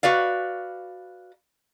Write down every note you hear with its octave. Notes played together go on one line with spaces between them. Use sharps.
F#4 B4 D5 F5